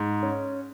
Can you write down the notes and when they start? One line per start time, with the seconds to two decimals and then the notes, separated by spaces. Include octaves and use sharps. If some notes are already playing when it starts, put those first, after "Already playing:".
Already playing: G#2
0.23 C#4